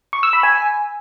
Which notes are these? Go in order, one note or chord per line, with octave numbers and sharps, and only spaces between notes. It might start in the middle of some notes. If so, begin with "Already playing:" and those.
C#6
E6
B5
G#5